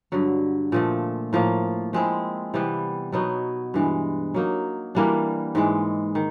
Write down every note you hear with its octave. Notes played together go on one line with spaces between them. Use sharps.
G2 D3 F#3
A#2 F3 A3
A2 F3 A#3
F3 G#3 C4 E4
C3 E3 G3 B3
B2 F#3 B3 D#4
G2 E3 G#3
F#3 A#3 D#4
E3 G3 A#3 D4
G#2 E3 G#3
D#3